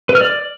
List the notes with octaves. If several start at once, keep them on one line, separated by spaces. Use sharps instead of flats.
B4
F6
D5